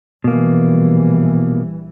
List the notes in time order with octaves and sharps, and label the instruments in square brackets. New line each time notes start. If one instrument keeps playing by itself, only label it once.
[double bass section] A#1 E3 G3 [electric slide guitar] B2 A#3